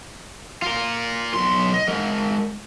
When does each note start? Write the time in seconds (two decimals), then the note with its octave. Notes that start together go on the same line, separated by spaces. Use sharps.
0.62 F4 A#4
1.34 B1 C6
1.74 D#5
1.88 G#3 A#4